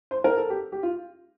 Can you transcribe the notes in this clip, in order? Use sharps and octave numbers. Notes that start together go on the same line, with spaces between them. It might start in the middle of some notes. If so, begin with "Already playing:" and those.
C5
A#4
A4
G4
G4
F4